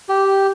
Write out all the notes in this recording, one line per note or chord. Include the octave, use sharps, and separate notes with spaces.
G4